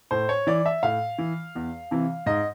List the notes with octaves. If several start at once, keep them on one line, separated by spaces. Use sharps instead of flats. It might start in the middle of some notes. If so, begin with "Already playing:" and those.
A2 C5
C#5
E3 D5
E5
A2 F5
E3
E2
C3 E3
G#2 D#5